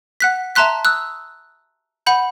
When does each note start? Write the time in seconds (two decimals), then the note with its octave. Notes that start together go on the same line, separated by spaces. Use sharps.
0.20 F#5 F#6 B6
0.55 E5 A5 A#5 C6 F#6 B6
0.85 D#6 E6 F#6
2.06 F#5 B5 G6